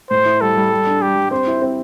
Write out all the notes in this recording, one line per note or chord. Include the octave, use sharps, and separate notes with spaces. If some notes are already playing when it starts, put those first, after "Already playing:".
A2 C5
E4
G3 A4
G3
G3
D4
G3 G4
G3
C4 C5
E4
C4